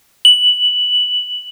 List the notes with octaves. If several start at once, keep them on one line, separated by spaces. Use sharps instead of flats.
F#7